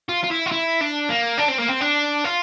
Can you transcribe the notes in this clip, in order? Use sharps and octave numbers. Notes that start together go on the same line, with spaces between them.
F4
F4
E4
F4
E4
D4
A#3
D4
C4
A#3
C4
D4
F4